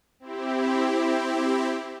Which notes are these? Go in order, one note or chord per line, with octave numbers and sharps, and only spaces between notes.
C4 E4 G4